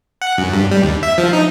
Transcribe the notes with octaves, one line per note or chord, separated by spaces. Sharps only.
F#5
F#2
G2
G3
D#2
E5
F3
D#4